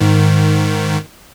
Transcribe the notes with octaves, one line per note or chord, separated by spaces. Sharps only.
G#2 D#3